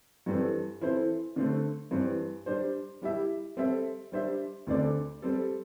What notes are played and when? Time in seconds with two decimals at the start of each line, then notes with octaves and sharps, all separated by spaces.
0.26 G2 E3 C4 A4
0.81 E3 C4 E4 A4 C5
1.36 D3 A3 C4 A4
1.91 G2 E3 C4
2.46 G3 D4 C5
3.02 G3 E4 G4 E5
3.57 G3 C4 A4 E5
4.12 G3 D4 C5 E5
4.67 D2 D3 C4 A4 D5
5.22 G3 C4 A4